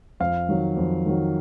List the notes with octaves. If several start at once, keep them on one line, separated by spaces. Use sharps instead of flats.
F2 F5
D#3 F#3
F2
D#3 F#3